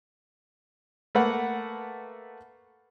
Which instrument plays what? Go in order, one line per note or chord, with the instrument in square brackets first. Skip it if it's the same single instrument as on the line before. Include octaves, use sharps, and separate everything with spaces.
[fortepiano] A3 A#3 B4 F#5